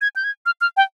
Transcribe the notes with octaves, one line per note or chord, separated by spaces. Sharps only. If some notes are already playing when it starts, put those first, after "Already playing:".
G#6
G6
G#6
F6
F6
G5